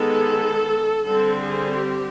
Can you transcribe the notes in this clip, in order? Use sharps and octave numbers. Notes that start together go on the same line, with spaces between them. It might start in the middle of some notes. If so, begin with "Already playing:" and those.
Already playing: D#3 G#3 B3 A4
D3 G3 C4 A4
G#4
G4